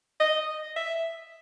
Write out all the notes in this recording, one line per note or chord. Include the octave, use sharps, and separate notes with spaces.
D#5
E5